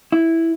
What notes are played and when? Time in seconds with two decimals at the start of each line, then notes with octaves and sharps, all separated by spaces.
0.12 E4